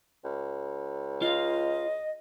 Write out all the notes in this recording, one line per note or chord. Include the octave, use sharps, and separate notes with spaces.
C#2
F4 D#5 F5